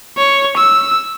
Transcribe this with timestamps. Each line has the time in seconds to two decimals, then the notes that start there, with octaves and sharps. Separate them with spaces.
0.17 C#5
0.57 E6